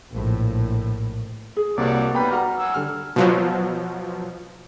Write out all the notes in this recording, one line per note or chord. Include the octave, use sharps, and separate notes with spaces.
A#1 A2
G#4
C2 C3 A#3 F#4 C#5 D5
G3 B3 D#4 B4 G5 A#5 B5
F#4 F#5 A#5 F6
F#3 G#5 E6
D3 G3 F6
B2 F3 F#3